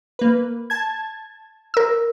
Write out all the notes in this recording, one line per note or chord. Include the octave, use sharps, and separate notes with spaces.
A#3 B4
A5 G#6
A#4 E6